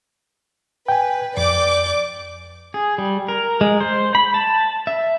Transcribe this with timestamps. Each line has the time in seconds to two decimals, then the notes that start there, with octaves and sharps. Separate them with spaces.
0.88 B4 G5 G#5
1.37 F2 D5 D6 G6
2.74 G#4
2.98 G3
3.28 A#4
3.61 G#3
3.81 C5
4.15 B5
4.34 A5
4.87 E5